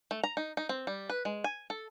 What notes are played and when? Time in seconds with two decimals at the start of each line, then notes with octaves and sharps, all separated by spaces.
0.11 A3
0.23 A#5
0.37 D#4
0.57 D#4
0.69 C4
0.87 G3
1.09 B4
1.25 G#3
1.44 G#5
1.70 A4